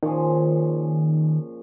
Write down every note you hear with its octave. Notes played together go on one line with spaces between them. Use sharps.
A#2 D#3 F3 C#4 G#4